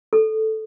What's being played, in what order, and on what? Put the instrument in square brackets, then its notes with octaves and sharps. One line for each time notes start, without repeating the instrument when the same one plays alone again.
[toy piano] A4